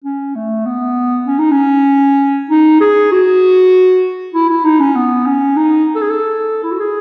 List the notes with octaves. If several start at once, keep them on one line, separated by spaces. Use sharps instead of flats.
C#4
A3
B3
C#4
D#4
C#4
D#4
G#4
F#4
E4
E4
D#4
C#4
B3
C#4
D#4
A4
G#4
A4
E4
F#4
G#4